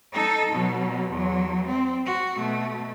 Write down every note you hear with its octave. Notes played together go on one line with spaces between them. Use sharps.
D#4 A4
B2 F#3
E2 F#3
C4
F#4
B2 A3